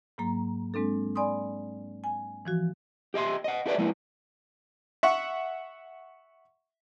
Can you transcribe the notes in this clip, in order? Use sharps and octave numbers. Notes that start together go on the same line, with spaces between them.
G#2 F#3 A#3 A#5
G#3 C4 D4 A4
D5 G#5 B5 C6 D#6
G#5
E3 F3 F#4
G4 D#5 E5 C6
D#5 F#5
E4 G4 A4 B4 D5 E5
F3 G#3 A#3 B3 E4
E5 F#5 C#6